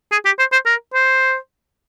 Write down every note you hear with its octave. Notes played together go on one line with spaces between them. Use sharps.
G#4
G4
C5
C5
A#4
C5